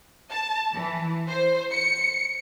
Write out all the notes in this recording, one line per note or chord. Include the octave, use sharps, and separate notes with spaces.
A5
E3
C5
C#7